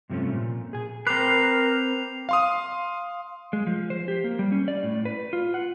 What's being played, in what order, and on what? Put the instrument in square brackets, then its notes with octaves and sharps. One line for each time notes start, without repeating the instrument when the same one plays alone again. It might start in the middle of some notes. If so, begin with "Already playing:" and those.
[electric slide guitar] G2 C3 F3 A3 C#4
A#2
G#4 G#5
[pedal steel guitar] C4 B4 [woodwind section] A#4 [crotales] D6 C7 F7
[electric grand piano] F5 C6 D#6
[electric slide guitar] G#3
F3
C5
G4
A#3
G3
C#4
D5
A2
B4
F4
F#5